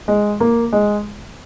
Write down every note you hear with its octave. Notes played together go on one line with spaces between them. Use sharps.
G#3
A#3
G#3